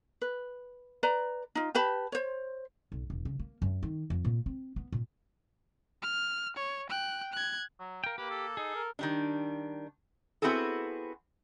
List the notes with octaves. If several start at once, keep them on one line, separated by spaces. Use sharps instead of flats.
B4
B4 D5 A#5
D#4 F4
G4 B4 A5 B5
C5 C#5
B1
E1
C#3
A#3
F#2
D#3
F2
A#2
C4
B3
A#2
F6
C#5
G5 F#6
F#6 G#6
F#3
A#4 F5 G5
A#3 G4 B4
A4
D#4 G#4
A#4
D#3 G3 D4
B3 C4 E4 F#4 G#4 A4